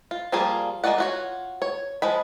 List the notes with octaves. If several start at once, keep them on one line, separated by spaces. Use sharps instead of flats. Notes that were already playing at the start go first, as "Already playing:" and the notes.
F4
F3 G3 A#3 F4 G#4
G#3 A#3 F4 D5 F#5
F4 F#4 C#5
C#5
F3 G#3 B5